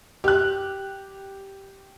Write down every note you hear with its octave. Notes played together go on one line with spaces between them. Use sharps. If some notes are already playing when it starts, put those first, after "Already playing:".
G4 F#6